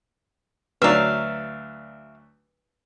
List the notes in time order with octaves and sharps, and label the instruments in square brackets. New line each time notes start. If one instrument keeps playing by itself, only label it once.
[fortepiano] D2 F#3 D4 [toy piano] B4 A#5 [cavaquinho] E5 F5